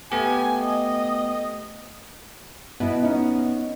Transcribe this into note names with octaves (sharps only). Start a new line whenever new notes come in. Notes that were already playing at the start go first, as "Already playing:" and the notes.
A3 B3 G4 G#5
D#5
B2 B3 E4
C#4 D#4